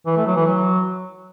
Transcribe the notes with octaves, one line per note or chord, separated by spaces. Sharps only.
E3
A3
F#3
E3
F#3